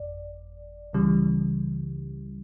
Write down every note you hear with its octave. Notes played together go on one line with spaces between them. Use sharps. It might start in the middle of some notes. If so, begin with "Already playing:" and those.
Already playing: G1 F2 D5
C#2 C#3 E3 G3